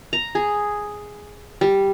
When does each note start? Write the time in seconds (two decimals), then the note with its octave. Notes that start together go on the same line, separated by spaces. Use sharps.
0.13 A#5
0.35 G#4
1.61 G3